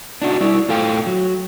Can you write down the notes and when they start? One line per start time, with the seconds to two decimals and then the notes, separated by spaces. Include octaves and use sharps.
0.22 D4 D#4 F#4
0.41 G3 E4 D5
0.69 A2 F4 A4 F5 G5
1.06 F#3